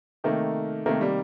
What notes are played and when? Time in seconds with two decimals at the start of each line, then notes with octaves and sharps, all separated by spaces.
0.24 C3 D#3 A3 A#3
0.86 C3 D#3 A3 A#3
1.01 G3